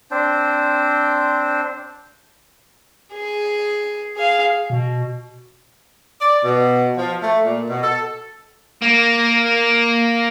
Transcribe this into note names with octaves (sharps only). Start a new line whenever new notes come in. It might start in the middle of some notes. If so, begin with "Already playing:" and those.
C4 D4 C5
G#4
G#4 F5
B2
D5
B2
F3
A3
A#2
B2
A4
A#3